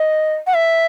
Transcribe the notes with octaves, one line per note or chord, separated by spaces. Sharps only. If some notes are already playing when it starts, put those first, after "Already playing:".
Already playing: D#5
F#5
E5